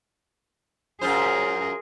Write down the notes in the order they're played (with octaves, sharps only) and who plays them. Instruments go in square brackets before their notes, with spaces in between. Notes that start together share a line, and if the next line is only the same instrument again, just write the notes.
[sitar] F#2 F4 C5 [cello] G#4 A#4